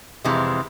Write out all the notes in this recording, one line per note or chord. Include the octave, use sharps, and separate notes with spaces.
F2 C3 E3 G#3